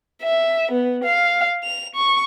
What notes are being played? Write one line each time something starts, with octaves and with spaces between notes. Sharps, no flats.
E5
B3
F5
F7
C#6